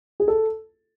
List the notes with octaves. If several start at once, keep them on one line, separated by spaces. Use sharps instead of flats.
G#4
A4